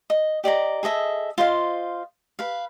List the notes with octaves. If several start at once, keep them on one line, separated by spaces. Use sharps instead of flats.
D#5
G4 D5 D#5 A#5
G#4 A4 D#5 E5
F4 C5 D#5 F5
B4 F5